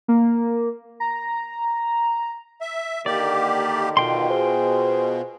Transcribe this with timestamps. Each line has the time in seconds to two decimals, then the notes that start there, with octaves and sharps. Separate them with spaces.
0.08 A#3
1.00 A#5
2.61 E5
3.06 D3 D#3 A#3 G4 D5
3.97 B2 F4 G5 C6
4.29 G#4 C5